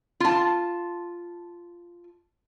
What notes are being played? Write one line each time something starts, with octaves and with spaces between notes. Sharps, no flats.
F4 A5